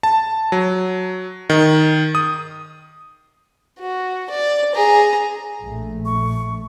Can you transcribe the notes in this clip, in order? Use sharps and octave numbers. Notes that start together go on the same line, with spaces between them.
A5
F#3
D#3
D#6
F#4
D5
G#4 A#5
A#1 A3
C#6